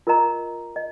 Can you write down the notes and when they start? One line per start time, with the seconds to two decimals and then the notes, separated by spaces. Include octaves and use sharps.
0.07 F4 A#4 D#5 A#5
0.76 D#5